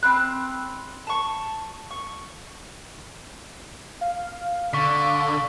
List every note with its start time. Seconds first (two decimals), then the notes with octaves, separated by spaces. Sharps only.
0.03 C4 B5 F#6
1.07 A5 C#6
1.91 C#6
4.01 F5
4.73 D3 C#6 B6